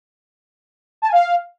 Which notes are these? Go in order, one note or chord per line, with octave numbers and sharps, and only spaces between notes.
A5
G#5
F5